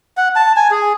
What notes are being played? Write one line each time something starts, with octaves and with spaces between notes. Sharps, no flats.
F#5
A5
G#5
G#4